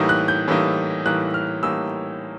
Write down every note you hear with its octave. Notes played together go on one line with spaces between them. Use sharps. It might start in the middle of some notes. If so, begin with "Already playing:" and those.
Already playing: A2 E3 G3 A#3 D#4
F#6
G6
A2 E3 G3 A#3 D#4
A2 E3 G3 A#3 D#4 F#6
F6
A2 E3 G3 A#3 D#4 E6